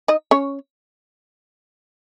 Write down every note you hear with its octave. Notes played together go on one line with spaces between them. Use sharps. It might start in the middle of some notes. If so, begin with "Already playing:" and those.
D#4 D#5
C#4 C#5